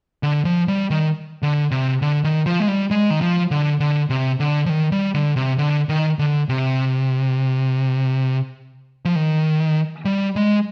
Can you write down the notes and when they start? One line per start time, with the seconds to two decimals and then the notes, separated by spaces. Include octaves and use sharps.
0.23 D3
0.45 F3
0.68 G3
0.90 D#3
1.43 D3
1.71 C3
2.02 D3
2.24 D#3
2.46 F3
2.60 G#3
2.68 G3
2.91 G#3
3.10 D#3
3.21 F3
3.51 D3
3.80 D3
4.10 C3
4.40 D3
4.66 F3
4.69 D#3
4.92 G3
5.15 D3
5.36 C3
5.58 D3
5.89 D#3
6.19 D3
6.49 C3
9.05 F3
9.16 D#3
10.05 G3
10.36 G#3